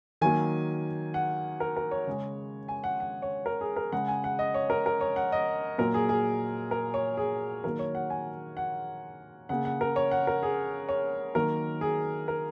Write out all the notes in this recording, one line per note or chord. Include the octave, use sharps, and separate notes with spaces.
D#3 F#3 A#3 G#5
F#5
A#4
A#4
C#5
C#3 G#3
G#5
F#5
F#5
C#5
A#4
G#4
A#4
C#3 G#3 F#5
G#5
F#5
D#5
C#5
A#4
A#4
C#5
F#5
D#5
A#2 F#3 A#3 A#4
G#4
G#4
A#4
C#5
G#4
D#3 F#3 A#3 A#4
C#5
F#5
G#5
F#5
C#3 A#3 F#5
F#5
A#4
C#5
F#5
A#4
G#4
C#5
D#3 F#3 A#3 A#4
G#4
A#4